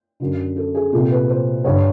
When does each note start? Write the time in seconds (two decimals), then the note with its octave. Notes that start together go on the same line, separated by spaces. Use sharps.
0.20 F#2 D3
0.56 A4
0.75 G#4
0.92 C2 A#2 A4
1.10 B4
1.29 C5
1.64 G2 D3 C#5